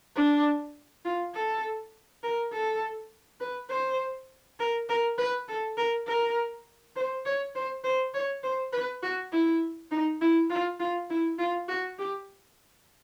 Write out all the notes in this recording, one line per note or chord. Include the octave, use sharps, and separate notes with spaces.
D4
F4
A4
A#4
A4
B4
C5
A#4
A#4
B4
A4
A#4
A#4
C5
C#5
C5
C5
C#5
C5
B4
F#4
E4
D#4
E4
F4
F4
E4
F4
F#4
G4